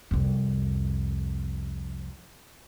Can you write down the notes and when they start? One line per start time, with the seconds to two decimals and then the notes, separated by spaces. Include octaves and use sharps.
0.11 C2 F2